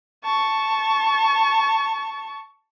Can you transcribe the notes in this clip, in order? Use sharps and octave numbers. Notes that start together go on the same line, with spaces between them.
A5 C#6